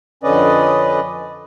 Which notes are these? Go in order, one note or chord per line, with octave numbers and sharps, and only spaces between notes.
F2 D3 C#4 B4 D5 D#5